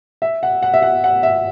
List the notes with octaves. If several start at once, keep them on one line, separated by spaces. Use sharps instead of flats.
E5
F#5
F#5
E5
F#5
F#5
E5